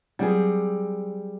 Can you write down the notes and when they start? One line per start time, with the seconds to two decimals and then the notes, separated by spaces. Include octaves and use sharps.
0.19 F#3 G3 C4 G#4